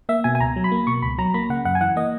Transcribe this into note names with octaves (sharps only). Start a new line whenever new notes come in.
A#3 E5
B2 G#5
G#5
C#2 A#5
F#3
B5
A#3
B2 C#6
C#2 B5
F#3 A#5
A#3 B5
C#3 F#5
F#2 F#5
G#5
E3 F#5
A#3 D#5